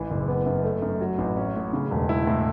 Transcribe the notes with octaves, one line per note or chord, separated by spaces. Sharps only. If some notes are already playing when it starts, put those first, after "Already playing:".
Already playing: A1 E3
F#1
B3
F#2
A3
F#2
F#3
A1
C#4
A2
C#3
E1
E4
A2